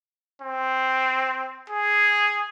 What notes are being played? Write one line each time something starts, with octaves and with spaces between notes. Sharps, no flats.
C4
G#4